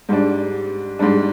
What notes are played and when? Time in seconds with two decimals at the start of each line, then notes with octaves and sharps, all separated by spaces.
0.09 G#2 G3 D4
0.99 G#2 G3 D4